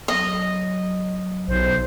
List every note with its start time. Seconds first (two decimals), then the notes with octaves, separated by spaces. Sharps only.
0.08 F#3 D#5
1.48 B1 C5